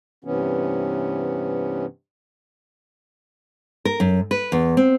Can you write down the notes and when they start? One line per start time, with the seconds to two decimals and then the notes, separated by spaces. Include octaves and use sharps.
0.25 G2 C3 E3 B3 C#4
3.85 A#4
4.00 F#2
4.31 B4
4.52 E2
4.77 C4